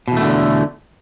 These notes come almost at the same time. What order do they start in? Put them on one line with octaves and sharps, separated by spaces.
B2 E2 A3 D3